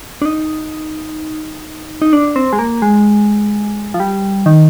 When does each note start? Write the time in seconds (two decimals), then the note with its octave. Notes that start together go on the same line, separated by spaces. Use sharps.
0.22 D4
0.25 D#4
2.02 D#4
2.13 D4
2.36 C4
2.53 G#3
2.59 A#3
2.82 G#3
3.94 F3
4.00 G3
4.46 D#3